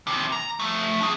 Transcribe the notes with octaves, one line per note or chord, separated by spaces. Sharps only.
D#2 C3
A#5
F3 A3
D4 G#4